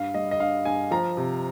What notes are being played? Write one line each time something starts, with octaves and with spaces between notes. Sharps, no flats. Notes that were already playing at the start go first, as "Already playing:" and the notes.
Already playing: G2 F5
G3 D#5
D#5
G2 F5
G2 G#5
F3 A#5
C3